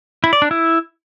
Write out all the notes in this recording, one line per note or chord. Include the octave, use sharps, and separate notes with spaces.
E4
D5
D4
E4